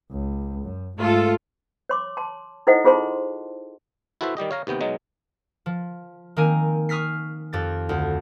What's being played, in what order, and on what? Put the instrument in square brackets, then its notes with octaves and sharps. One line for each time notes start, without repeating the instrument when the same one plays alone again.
[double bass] C#2
F#2
[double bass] G#2 A3 [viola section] F4 A4
[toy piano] C#5 C6 D6
A5 C6
D#4 E4 A4 C5 D#5 F#5
F4 G#4 C5 A5 C6
[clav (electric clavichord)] E4 F#4 A4 B4 C5 E5
D#3 G3 G4 D#5
C#5 F5 A#5
D#2 C3 B3 G5
B2 F#3 G#3 D#4
[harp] F3
D#3 A#3 C4 A#4 G#5
C#6 D#6 F6 B6 C7
F2 G4 A6
D2